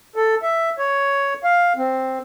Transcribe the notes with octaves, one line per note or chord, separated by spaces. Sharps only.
A4
E5
C#5
F5
C4